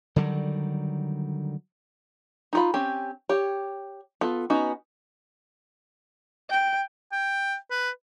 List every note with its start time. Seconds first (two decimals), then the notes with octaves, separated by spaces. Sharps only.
0.16 D3 D#3 F#3 G3
2.53 D#4 F4 B5
2.74 C4 C#4 G4
3.29 G4 C#5
4.21 B3 F4 A4
4.50 B3 C#4 D#4 F#4
6.50 G5
7.12 G5
7.71 B4